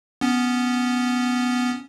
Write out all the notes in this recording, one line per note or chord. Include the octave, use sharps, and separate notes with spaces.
B3 C#4